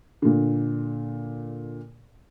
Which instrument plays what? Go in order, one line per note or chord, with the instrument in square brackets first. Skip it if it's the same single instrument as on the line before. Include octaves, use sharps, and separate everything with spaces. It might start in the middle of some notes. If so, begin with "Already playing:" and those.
[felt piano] A#2 D3